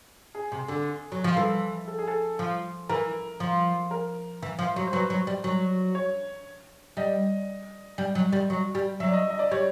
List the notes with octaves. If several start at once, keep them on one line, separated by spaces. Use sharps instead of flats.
G#4
C3
D3
F#3
F3
E3 A4
A4
G#4
A4
F3
E3 A#4
F3
A#4
E3
F3
F#3
C5
F#3 B4
F#3
G3
F#3
C#5
G3 D#5
G3
F#3
G3
F#3
G3
F#3 E5
D5
D#5
D#5
D5
G3 C#5